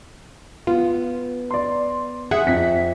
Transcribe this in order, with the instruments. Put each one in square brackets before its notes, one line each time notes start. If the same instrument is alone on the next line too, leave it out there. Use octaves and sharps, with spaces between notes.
[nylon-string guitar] B3 [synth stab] F4
[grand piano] D5 C6
[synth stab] G#4 F#5 [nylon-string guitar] E5
[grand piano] F2 B6